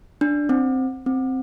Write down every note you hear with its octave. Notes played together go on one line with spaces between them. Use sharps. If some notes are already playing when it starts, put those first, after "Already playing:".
D4
C4
C4